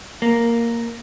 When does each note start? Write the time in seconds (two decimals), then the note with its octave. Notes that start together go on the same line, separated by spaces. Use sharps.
0.22 A#3